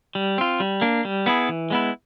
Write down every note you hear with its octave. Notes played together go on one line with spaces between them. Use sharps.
G3
C4 F4
G3
A#3 D4
G3
B3 E4 G#4
E3
G#3 B3 E4